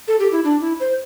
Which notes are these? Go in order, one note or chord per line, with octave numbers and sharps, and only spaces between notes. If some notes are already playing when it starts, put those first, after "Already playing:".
A4
G4
E4
D4
E4
C5